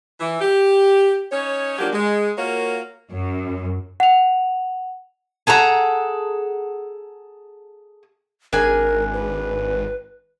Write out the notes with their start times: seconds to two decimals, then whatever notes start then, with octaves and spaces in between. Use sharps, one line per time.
0.20 E3
0.41 G4
1.31 C#4 D#4 C#5
1.78 F3 F#3 A#3 D4 G4
1.93 G#3
2.38 A#3 F4 F#4 A#4 C#5
3.13 F#2
4.00 F#5 F7
5.47 G#4 A4 F#5 A#5
8.53 G#1 D4 G#4 A#4 G#5
9.13 B4